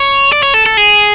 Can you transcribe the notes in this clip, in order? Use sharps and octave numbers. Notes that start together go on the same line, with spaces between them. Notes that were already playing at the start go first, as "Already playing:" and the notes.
Already playing: C#5
D5
C#5
A4
A4
G#4